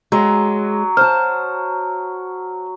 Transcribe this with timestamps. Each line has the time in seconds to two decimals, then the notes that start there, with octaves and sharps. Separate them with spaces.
0.12 F#3 G#3
0.97 C5 A5 F6